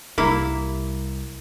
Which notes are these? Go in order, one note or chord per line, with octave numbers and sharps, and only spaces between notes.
C2 G3 A#3 E4